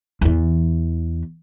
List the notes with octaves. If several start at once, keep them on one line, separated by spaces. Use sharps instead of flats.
E2 E3